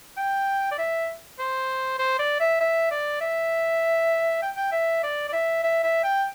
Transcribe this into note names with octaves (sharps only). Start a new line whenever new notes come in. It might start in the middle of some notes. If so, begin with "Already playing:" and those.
G5
D5
E5
C5
C5
D5
E5
E5
D5
E5
G5
G5
E5
D5
D5
E5
E5
E5
G5